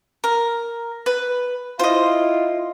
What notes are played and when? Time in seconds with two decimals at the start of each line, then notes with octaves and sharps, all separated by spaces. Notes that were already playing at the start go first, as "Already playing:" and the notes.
0.24 A#4
1.06 B4
1.79 E4 F4 C5 D#5